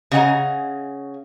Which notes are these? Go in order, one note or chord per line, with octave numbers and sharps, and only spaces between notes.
C#3 G#4 D#5 F#5 G#5 A#5